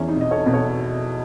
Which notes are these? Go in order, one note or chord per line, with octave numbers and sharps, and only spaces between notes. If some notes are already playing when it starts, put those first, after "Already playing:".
Already playing: E2 C#4 E4
D#4
B2 D#5
A4 C#5
B2
A4 C#5